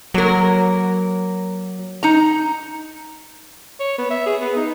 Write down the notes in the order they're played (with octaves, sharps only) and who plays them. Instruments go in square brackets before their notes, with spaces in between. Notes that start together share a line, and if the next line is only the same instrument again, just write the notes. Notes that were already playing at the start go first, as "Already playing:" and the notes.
[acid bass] F#3 [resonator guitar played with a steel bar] A#3 A#4
[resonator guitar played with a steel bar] D#4 A#5
[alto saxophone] C#5
B3
E5
G#4
B3
D#4